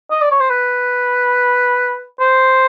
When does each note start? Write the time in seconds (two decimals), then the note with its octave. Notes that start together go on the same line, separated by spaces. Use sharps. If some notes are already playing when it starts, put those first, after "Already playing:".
0.11 D#5
0.21 D5
0.31 C#5
0.41 C5
0.50 B4
2.20 C5